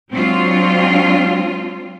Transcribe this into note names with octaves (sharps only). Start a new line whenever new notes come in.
F#3 G#3 C4 D4 F4